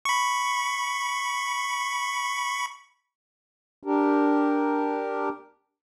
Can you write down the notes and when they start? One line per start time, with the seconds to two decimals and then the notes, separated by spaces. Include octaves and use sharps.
0.05 B5 C#6
3.83 D4 G4 A#4